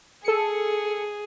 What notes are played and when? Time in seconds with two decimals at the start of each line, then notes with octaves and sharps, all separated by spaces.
0.24 G#4 A4 C#7